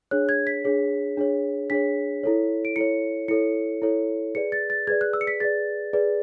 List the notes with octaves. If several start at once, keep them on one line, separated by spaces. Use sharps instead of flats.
D4 G#4 C#5 F#6
G#6
B6
D4 G#4 C#5
D4 G#4 C#5
D4 G#4 C#5 B6
E4 A4 C#5
D7
E4 A4 C#5 C#7
E4 A4 C#5 C#7
E4 A4 C#5
G#4 B4 D5 C#7
A6
A6
G#4 B4 D5 G#6
F#6
E6
C#7
B6
G#4 B4 D5 A6
G#4 B4 D5